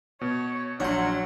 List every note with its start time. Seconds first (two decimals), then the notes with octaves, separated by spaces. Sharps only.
0.21 B2 C#5
0.80 A#1 F#3 D4 C#5 F#5 C6 G6